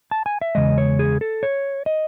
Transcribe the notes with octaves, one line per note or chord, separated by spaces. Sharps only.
A5
G#5
E5
E2 C#3 G#3 D#5
C#5
G#4
A4
C#5
D#5